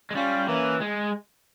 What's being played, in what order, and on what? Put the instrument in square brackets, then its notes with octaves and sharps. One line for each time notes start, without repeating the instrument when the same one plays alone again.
[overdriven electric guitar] G#3
[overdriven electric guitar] G3 [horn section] C#4 F4
[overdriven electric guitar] E3 [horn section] A#3 C#4
[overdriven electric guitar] G#3